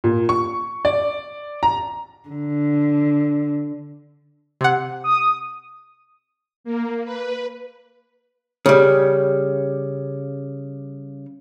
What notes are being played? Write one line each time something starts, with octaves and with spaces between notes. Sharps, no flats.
A#2
C#6
D5
A#5
D3
C3 F#5
D#6
A#3
B4
C#3 G3